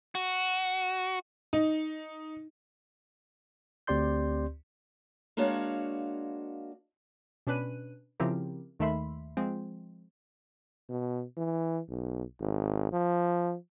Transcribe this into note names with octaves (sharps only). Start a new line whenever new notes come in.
F#4
D#4
D2 C4 G4 D5 C6 G6
G#3 A#3 D4 F#4 C#5 F5
B2 C#4 D4 B4 F#6 D#7
C#3 F3 C4 E4 G4 A#4
D#2 D#3 A3 E5 B5 C6
F3 G#3 C4
B2
E3
B1
G#1
F3